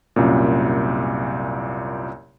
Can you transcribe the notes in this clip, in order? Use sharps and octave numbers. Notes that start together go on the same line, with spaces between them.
C2 F#2 A#2